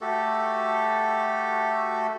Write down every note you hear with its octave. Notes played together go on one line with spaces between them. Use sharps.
A3 F#4 G4 A4